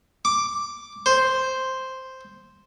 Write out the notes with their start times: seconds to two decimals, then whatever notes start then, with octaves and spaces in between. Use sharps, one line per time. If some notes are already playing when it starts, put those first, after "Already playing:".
0.25 D6
1.06 C5